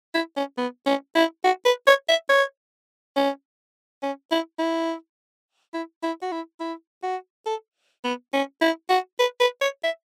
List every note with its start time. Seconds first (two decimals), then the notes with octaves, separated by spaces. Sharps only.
0.15 E4
0.37 C#4
0.58 B3
0.86 C#4
1.16 E4
1.44 F#4
1.65 B4
1.87 C#5
2.09 E5
2.29 C#5
3.16 C#4
4.03 C#4
4.31 E4
4.59 E4
5.74 E4
6.03 E4
6.22 F#4
6.32 E4
6.60 E4
7.03 F#4
7.46 A4
8.04 B3
8.33 C#4
8.61 E4
8.90 F#4
9.19 B4
9.40 B4
9.61 C#5
9.84 E5